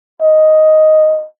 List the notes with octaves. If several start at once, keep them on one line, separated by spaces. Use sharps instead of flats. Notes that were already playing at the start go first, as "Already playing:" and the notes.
D#5